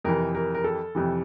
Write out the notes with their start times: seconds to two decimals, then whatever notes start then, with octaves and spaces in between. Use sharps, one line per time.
0.04 F2 C3 E3 A#4
0.35 A#4
0.54 A#4
0.64 A4
0.95 F2 C3 E3